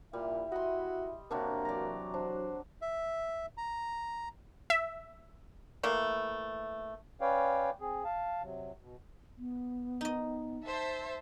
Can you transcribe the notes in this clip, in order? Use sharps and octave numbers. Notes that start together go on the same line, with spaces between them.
A#2 G3 E4 E5
F#4 D#5 C6
C3 F#3 A#3 D4
E3 F#3 D5 A#5
D4 C5
E5
A#5
E5
E3 A3 A#3
C#4 B4 C#5 D5 F5 G5
C4 G#4
F5 A5
C3 F#3
B2
B3
D#4 D#5
C5 E5 A5